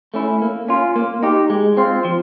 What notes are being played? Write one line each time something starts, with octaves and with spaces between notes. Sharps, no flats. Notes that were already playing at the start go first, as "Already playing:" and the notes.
A3 C#4 E4
A#3
C#4 F4
A#3
D#4 G4
G#3
C4 F4
F3